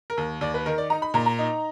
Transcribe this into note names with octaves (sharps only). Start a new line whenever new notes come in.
A#4
D#2
D#2 D5
B4
D#3 A#4
D5
D#4 A#5
B5
A#2 A#5
A#5
D#4